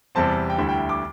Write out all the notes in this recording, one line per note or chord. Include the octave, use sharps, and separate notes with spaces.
E2 C3 G3 C4 A5
G5
D2 D3 G3 E4 E5
G5
D6